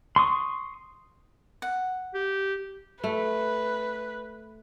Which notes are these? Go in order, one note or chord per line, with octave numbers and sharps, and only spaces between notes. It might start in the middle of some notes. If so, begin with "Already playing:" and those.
C6 C#6 D#6
F#5
G4
A3 B4